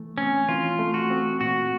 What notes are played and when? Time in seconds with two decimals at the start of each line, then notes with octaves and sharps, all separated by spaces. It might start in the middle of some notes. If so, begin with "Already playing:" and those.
Already playing: E3 A3
0.17 C4 C#4
0.49 E3 F4
0.79 A3
0.94 F#4
1.10 C4
1.41 A#2 F#4